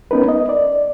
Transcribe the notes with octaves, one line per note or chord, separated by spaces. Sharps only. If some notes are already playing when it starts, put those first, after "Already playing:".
B3 C#4 D#4 A#4 B4
D#5
D5